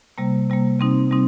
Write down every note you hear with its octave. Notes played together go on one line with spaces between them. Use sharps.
C3 G3 A#3
C3 G3 A#3
C3 G3 C4 D#4
C3 G3 C4 D#4